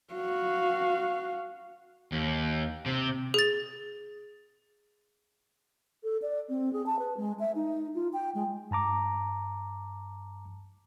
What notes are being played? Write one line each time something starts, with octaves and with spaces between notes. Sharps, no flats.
F#4 F5
D#2
C3
G#4 A6
A4
D5
C4
G#4
A5
B4
G#3
E5
D#4
F4
G5
G#3
G2 A5 A#5 D6